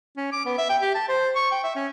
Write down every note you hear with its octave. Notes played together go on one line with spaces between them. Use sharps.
C#4
D6
B3
E5
G5
G4
A5
C5
C#6
G5
E5
C#4